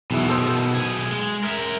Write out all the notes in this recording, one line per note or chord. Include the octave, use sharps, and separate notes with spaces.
B1 E2 B2 D#3 E4
A4 C5 D#5
B1 G#4
G#3
A#4 E5